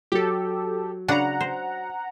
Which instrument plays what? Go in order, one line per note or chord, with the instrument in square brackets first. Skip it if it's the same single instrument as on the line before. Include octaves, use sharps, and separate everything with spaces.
[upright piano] F#3 [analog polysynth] G4 A4
[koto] C#3 D4 B4 [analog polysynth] F#5 A#5
[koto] C5